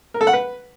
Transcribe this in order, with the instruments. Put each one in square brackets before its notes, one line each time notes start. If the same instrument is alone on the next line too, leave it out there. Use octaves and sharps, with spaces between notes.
[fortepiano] A#4
A4
F#5
B4